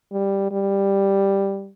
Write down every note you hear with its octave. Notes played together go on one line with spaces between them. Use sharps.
G3
G3